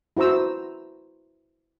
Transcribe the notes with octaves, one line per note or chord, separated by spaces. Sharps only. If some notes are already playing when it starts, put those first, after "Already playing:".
E4 F#4 C5 A#5 E6